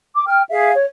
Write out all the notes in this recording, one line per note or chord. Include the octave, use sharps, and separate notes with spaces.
D6
G5 F6
G#4 E5 F5
C#5